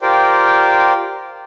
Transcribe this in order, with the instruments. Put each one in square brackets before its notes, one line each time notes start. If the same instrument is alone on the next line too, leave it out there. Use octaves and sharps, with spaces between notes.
[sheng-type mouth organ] F4 G4 A#4 C5 D5 G5